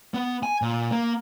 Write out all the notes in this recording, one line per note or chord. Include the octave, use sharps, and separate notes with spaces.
B3
G#5
A#2
A#3